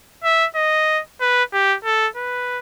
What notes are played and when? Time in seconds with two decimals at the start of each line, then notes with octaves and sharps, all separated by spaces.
0.24 E5
0.56 D#5
1.21 B4
1.53 G4
1.85 A4
2.17 B4